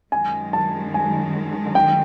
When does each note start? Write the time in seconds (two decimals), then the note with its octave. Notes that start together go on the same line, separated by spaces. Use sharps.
0.12 F#2 D#3 G#3 G#5
0.53 A5
0.94 G#5
1.75 G5